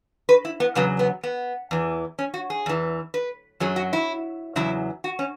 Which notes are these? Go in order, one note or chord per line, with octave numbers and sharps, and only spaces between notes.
B4
E4
B3
E2 C#3 F#3 B3
B3
B3
E2 E3
C#4
F#4
G#4
E2 E3
B4
F#2 F#3 G#4
F#4
E4
E2 C#3 F#3 E4
F#4
C#4